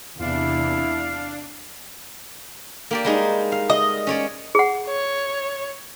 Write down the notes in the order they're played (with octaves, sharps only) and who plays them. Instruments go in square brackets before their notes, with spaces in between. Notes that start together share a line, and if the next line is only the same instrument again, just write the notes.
[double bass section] E2 C3 [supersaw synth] D4 [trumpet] E4 [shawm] F5
[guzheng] A#3 G4 D5
G3 G#3 D#4
F5
[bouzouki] D#5
[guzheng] C#4 C#5 D5
[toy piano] G#4 F#5
[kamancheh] C#5